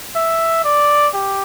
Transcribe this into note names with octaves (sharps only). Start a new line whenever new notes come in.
E5
D5
G4